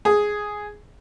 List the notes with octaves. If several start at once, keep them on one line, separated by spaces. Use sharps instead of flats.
G#4